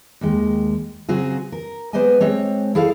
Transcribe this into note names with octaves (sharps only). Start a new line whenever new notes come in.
D#2 D#3 G#3
C#3 F#3 C4 F#4 G#4
A#4
G#3 B3 C5 D5 D#5 G#5
G#3 C4 C#5
E4 G#4 A4 D5 F5